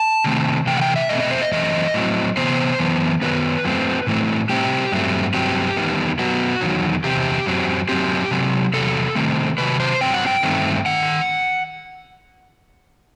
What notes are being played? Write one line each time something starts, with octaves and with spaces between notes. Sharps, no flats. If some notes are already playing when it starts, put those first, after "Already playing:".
Already playing: A5
C3 D#3 A3 C4
C3 E3 A3 G5
F#5
G5
E5
B2 A3 C4 D#5
D#5
C5
D#5
F#2 E3 A3 C4 D#5
A2 F#3 C4
C3 E3 B3 C5
F#2 E3 B3
F#2 D#3 F#3 B3 B4
F#2 F#3 A3 C4
A2 E3 A3 C4
A2 G3 C4 G4
G2 F#3 A3 C4
G2 F#3 C4 G4
E2 D#3 G3 B3
F#2 F#3 B3 F#4
E2 D#3 F#3
E2 C3 C4 G4
F#2 F#3 C4
F#2 F#3 C4 G4
C3 F#3 C4
E2 C3 F#3 A4
C3 D#3 A3 C4
C3 D#3 F#3 B4
C5
G2 F#3 C4 G5
F#5
G5
G2 D#3 A3 C4
D#3 F#5